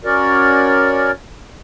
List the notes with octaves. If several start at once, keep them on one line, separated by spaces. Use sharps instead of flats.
C#4 F#4 A#4 C#5 D5